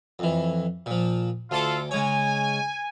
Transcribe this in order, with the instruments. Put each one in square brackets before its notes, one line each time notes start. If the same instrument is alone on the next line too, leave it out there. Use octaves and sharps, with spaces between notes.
[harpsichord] F2 E3
A#2 F3
[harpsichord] D2 C6 D6 [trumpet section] F4 A4
[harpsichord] C#3 G#3 C#5 [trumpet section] G#5